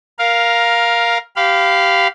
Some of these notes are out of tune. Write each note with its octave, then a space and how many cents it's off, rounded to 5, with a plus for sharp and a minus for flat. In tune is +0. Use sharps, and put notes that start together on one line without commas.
A#4 +10 F5 +0
G4 -15 F5 -5 B5 +30